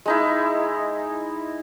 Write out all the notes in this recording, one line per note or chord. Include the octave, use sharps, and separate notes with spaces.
G#3 D#4 E4